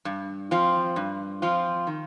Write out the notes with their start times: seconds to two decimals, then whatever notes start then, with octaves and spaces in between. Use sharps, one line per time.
0.05 G2
0.51 F3 C4 F4
0.96 G2
1.42 F3 C4 F4
1.87 D#3